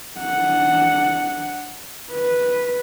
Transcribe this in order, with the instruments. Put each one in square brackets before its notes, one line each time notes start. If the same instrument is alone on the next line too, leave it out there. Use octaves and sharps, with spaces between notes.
[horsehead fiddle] D4 F#5
B4